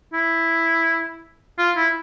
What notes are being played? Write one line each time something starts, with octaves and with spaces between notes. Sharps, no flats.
E4
F4
E4